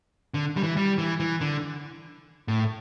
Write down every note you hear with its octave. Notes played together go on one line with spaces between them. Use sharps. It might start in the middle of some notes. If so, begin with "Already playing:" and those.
D3
G3
E3
G3
E3
E3
D3
A2